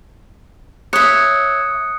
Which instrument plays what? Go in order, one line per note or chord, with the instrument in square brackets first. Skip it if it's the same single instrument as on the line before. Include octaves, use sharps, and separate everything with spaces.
[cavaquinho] C#5 E5 [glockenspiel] D#6 F#6 C#7